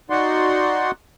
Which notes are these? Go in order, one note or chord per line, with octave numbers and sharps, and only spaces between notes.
D#4 F#4 D5 F#5 C6